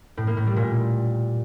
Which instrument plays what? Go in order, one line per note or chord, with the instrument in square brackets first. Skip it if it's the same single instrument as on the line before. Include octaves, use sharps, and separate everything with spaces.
[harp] A2
A#3
A2
G3
A#2